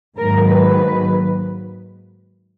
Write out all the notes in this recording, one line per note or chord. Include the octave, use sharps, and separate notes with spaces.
G#2 D#3 F#3 A#3 A#4
B4